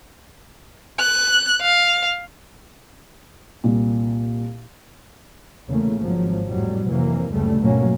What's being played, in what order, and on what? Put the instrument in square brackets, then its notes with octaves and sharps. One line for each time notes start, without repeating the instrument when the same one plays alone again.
[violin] F#6
F5
[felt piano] C2 A#2
[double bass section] E2 C#3 A3 A#3
G#1 F3 F#3
F2 A2 F#3 G3
F2 C3 E3 F#3 A#3
F#1 D2 G2 C#3 G3 A3
G#1 B2 F#3 A3 A#3 C#4